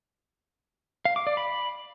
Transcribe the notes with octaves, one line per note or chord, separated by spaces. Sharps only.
F5
D6
D5
B5